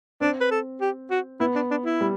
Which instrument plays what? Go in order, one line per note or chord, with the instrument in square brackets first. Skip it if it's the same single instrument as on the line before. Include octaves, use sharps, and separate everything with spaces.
[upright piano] C4 [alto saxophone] D4
[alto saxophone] B4
A4
G4
F#4
[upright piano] B3 [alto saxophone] E4
[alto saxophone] D4
D4
E4
[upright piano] G3